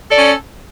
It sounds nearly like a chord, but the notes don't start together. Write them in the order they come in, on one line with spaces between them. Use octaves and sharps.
A4 D5 C#4